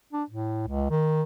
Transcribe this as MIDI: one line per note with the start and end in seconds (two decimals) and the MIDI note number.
0.13 0.23 62
0.30 0.64 45
0.68 0.90 37
0.90 1.22 51